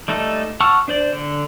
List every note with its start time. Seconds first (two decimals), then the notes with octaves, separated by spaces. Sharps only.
0.08 G3 A3 D#4 A4
0.60 F#5 A5 C#6 E6 F6
0.88 D4 C5 D5
1.13 D3